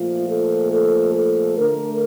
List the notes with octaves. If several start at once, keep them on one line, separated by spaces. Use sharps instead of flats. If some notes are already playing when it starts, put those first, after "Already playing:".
Already playing: A#2 F3 A3 F4
A4
A4
A4
D3 A3 A#4